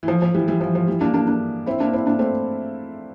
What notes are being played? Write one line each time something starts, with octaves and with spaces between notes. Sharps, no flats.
E3
F3
F3
E3 G3
E3 G3
F3
F3
E3 G3
A#3 D4
A#3 D4
A#3 D4
C4 E4
A#3 D4
C4 E4
A#3 D4
A3 C4